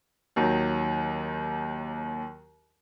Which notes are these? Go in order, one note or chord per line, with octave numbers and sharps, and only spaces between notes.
D#2 D#3 F#3